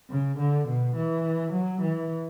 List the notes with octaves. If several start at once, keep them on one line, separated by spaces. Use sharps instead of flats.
C#3
D3
B2
E3
F#3
E3